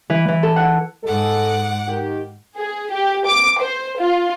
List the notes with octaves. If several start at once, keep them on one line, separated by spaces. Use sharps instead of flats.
E3
E3
A4
F#5
G#2 G#3 A4 F#5 D6
D#3 G4
G#4
G4
D6
C5
F4